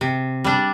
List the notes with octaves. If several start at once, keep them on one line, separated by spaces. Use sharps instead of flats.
C3
G3 D4